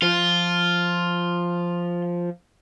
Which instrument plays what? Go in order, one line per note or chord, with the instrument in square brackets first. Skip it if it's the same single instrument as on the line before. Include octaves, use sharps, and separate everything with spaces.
[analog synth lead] F3 [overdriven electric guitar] F4